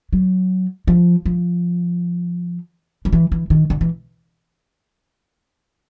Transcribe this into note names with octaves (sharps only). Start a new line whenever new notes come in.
F#3
F3
F3
F3
E3
E3
D#3
D3
E3